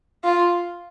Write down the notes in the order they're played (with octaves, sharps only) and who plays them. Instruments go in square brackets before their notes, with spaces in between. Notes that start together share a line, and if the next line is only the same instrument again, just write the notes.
[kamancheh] F4